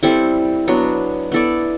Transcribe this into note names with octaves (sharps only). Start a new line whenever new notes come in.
G3 C4 E4 A4
F#3 B3 D4
B3 E4 A4 D5